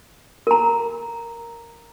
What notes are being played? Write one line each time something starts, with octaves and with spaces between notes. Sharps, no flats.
A#4 A#5